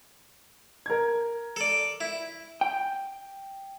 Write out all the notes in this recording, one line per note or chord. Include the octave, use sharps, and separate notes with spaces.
A#4 G#6
A4 D5
E4
G5